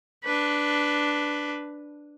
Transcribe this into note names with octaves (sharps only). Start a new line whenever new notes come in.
D4 B4